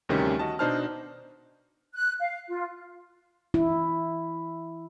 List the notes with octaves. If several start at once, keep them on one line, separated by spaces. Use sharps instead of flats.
D2 C3 D#3 G3 C#4
F#4 D#5 A5
B2 D4 D#4 C5 A5 F6
F#6
F5
F4
E4